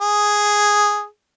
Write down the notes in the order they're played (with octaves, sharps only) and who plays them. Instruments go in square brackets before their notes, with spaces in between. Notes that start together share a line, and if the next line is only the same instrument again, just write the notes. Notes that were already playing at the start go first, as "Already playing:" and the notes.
[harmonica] G#4